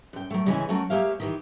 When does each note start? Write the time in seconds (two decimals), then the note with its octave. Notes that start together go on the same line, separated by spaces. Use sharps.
0.13 F#2 G5
0.31 F#3 A3
0.46 D2 C#3 E3 G#3 C#4 G#5
0.69 F#3 A3 C#4 F#4 A#4
0.90 G#3 A#3 G4 C#5 E5 F5
1.20 D#3 E3 G4